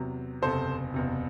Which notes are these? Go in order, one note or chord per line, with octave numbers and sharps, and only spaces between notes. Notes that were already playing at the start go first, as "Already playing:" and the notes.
Already playing: E2 C3 F#3
F#1 E2 C3 A4 C5
F#1 E2 C3